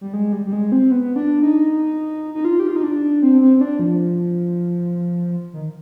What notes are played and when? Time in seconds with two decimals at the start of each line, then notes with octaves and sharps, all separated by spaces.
0.01 G3
0.13 G#3
0.32 G3
0.46 G3
0.53 G#3
0.72 C4
0.91 B3
1.16 D4
1.42 D#4
2.34 D#4
2.45 F4
2.60 G4
2.68 F4
2.76 D#4
2.84 D4
3.22 C4
3.41 C4
3.57 C4
3.61 D4
3.79 F3
5.53 D#3